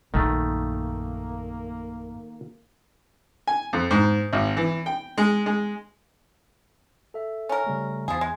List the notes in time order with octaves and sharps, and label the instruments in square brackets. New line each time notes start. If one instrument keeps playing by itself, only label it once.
[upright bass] A#1 F#2 [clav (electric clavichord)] D#3 A3 [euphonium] A#3
[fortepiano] G#5
F2
G#2
G#1
E3
G5
G#3
G#3
[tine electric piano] A4 E5
[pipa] C#4 A#4
[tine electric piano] C#3 G3 A3
[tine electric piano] E2 [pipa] F3 G#4
[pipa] G#3